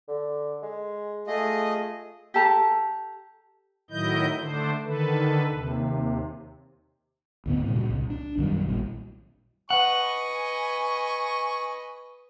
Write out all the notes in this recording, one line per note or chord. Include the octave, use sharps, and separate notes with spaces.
D3
G#3
A3 F4 G#4 D#5
G4 A4 A5 A#5
A2 D#3 F#3 E4 D#5 G6
D3 A3 D4 C5
D3 D#3 A4 B4
D#2 C3
D2 G#2 B3
G2 A#2 C#3 E3
C2
D4
B1 F#2 D#3 G3
A#1 G3
B4 D#5 F#5 G#5 C#6